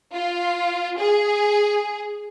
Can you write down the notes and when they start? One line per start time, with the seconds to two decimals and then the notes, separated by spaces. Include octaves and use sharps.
0.13 F4
0.99 G#4